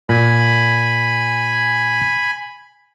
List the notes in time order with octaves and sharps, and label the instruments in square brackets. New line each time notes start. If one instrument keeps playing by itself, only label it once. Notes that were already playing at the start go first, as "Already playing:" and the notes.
[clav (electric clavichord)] A#2 [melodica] G#5 B5